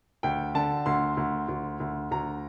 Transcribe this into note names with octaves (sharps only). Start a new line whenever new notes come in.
D2 G5
D3 A5
D2 C6
D2
D2
D2
D2 A#5